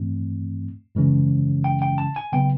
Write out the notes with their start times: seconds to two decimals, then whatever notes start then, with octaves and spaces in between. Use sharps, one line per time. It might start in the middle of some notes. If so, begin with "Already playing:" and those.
Already playing: G2 E3 A3 C4
0.95 F#2 C#3 E3 G#3 C#4
1.64 G5
1.82 G5
1.98 A5
2.16 G#5
2.33 C#3 F#3 B3 G5